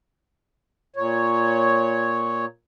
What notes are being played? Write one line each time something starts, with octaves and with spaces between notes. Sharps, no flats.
A#2 C#5